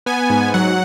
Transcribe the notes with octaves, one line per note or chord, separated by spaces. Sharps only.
B3 G#5
G#2
F#3 F#5